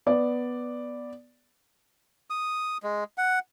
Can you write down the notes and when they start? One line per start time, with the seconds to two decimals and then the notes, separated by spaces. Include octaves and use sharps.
0.06 B3 D5
2.30 D#6
2.83 G#3
3.18 F#5